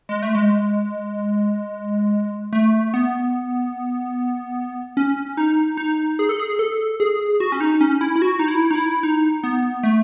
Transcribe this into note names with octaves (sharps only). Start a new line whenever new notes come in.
G#3
A3
G#3
A3
B3
C#4
D#4
D#4
G#4
A4
G#4
A4
G#4
F#4
C#4
D#4
C#4
E4
E4
F#4
D#4
E4
D#4
E4
D#4
B3
A3